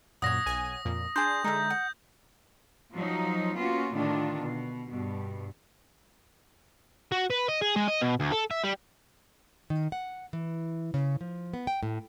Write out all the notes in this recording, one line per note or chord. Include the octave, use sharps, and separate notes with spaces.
F#2 A#2 C#5 F#5 D#6 A#6
B1 G#5
F2 A#2
D4 G#4 C6 G6
D3 G#3 D#4 E5
F#5
F3 F#3 D#4
A#3 B3 C#4 F4 F#4
A2 D3 D#3 D4 F4
B2
G2 B2
F#4
B4
D#5
G#4
G#3
D#5
B2
D2
A4
E5
G3
D#3
F#5
E3
C#3
F3
B3
G5
A2